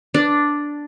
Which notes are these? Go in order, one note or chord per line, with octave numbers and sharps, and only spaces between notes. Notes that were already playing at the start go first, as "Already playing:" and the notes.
D4